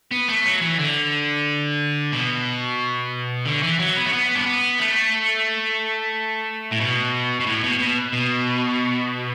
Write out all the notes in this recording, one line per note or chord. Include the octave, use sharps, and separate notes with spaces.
B3
A3
F#3
E3
D3
B2
D3
E3
F#3
B3
A3
B3
D4
B3
A3
A2
B2
B2
A2
B2
B2
B2